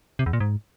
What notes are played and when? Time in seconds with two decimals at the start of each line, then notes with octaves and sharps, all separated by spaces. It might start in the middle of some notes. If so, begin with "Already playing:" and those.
0.19 C3
0.26 E2
0.33 A#2
0.40 G#2